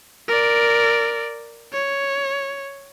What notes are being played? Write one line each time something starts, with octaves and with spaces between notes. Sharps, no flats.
A#4 D5
C#5